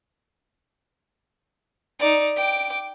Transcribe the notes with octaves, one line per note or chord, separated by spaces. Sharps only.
D#4 D5
G5 D6